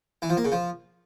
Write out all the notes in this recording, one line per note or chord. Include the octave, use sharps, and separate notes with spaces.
E3
F3
A#3
C#3
F3